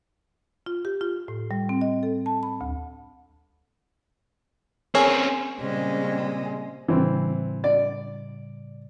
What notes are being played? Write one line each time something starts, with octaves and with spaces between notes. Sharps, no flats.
F4
G4
F4
A2
G3
C4
D#5
A4
A5
B5
D2
C4 C#4 G#4 A#4 C#5
A#2 C#3 G3 G#3 C4
A2 C#3 E3 G3 C4
D5